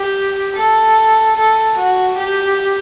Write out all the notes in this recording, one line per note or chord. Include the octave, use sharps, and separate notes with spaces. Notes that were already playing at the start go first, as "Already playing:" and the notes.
Already playing: G4
A4
A4
F#4
G4